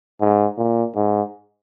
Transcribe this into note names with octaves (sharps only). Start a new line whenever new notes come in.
G#2
A#2
G#2